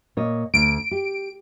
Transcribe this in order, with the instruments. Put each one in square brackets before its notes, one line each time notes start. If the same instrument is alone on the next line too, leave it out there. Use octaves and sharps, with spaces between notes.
[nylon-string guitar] A#2 C#5 D#5
[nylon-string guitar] D2 D4 [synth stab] D7
[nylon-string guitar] G4